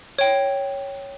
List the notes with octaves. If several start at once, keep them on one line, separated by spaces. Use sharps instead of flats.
C#5 G5